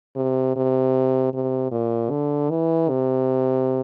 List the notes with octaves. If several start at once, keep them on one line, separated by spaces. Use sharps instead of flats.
C3
C3
C3
A#2
D3
E3
C3